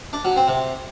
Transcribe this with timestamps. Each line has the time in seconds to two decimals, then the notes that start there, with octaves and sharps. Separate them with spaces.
0.13 D4
0.25 F#3
0.36 C4
0.48 C3